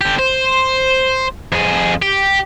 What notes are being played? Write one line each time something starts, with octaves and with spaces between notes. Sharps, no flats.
D3 G4
C5
F2 G#4
G4